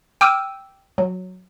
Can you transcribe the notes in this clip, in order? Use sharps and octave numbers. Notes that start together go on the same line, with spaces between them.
G5 D6 E6 F6 D#7
F#3